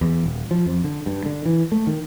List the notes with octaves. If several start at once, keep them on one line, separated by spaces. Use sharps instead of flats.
E2
D#1
F3
F2
D3
G2
D3
E3
A3
D#3